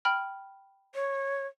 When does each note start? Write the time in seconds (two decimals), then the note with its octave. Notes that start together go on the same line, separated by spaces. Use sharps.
0.05 G5 B5 F6
0.95 C#5